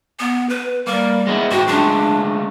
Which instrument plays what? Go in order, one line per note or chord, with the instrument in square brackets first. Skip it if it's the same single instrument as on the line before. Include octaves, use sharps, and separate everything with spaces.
[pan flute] B3
B4
[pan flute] G3 [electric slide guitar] A#3
[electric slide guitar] G#3 B3 E4
[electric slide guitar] G#2 G5 [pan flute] F#4
[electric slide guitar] G#3 A3 C#4 [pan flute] D4